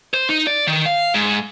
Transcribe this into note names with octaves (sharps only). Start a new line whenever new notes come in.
C5
D#4
D5
D#3
F5
G#2